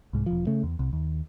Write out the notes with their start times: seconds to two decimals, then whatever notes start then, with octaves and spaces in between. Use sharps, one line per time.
0.13 C2 G#2
0.26 E1 F3
0.47 C#3 A3
0.63 E2
0.79 C2
0.93 D#2